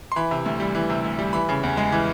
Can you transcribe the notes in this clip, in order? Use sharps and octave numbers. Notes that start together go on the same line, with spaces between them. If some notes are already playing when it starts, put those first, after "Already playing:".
C6
E3 B5
C3
D2
G3
E3
C3
D2
G3
E3 B5
C#3
E2
G#3
E3